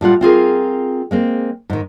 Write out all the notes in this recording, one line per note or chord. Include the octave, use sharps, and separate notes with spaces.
A2 G3 F4 F#5
C4 F4 G#4 A#4
G#3 A#3 C4
G#2 D#3